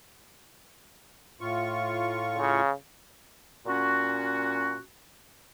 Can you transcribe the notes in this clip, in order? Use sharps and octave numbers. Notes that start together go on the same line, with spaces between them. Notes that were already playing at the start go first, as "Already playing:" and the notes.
A2 F4 C#6
C#3
A#2 C#4 F#4